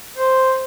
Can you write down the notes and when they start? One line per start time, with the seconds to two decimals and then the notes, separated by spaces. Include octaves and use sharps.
0.17 C5